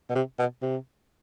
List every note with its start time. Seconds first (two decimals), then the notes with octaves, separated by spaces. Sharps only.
0.10 B2
0.15 C3
0.38 B2
0.62 C3